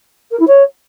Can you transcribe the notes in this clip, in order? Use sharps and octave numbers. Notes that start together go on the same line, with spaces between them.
A#4
E4
C#5